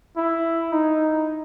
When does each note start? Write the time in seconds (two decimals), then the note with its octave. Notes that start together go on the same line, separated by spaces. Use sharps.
0.17 E4
0.72 D#4